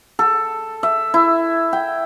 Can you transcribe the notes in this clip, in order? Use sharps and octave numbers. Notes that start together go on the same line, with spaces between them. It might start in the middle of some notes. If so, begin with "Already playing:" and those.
A4
E5
E4
G5